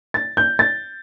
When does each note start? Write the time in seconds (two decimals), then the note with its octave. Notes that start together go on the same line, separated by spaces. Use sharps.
0.14 A6
0.37 G6
0.59 A6